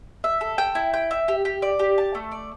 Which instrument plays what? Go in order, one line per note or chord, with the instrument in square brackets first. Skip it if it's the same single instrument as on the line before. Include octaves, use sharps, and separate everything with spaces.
[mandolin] E5
A4
G5
E4
G5
E5
G4
G4
D5
G4
A5
A3
D5